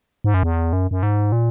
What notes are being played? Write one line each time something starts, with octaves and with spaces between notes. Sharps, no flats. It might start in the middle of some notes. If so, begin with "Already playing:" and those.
G#2
F#2
E2
F#2
F#2
G#2
A#2